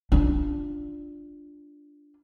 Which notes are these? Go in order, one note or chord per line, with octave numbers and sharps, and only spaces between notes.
D4 F4